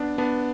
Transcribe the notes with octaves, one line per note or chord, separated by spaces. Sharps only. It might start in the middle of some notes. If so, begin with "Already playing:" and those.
Already playing: B3 D4
B3 D4